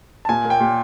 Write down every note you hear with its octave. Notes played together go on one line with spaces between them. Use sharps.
A5
A#2 G#5
A#3
G5
A#2